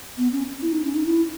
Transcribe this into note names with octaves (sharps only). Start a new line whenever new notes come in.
B3
C#4
E4
D#4
C#4
D#4
E4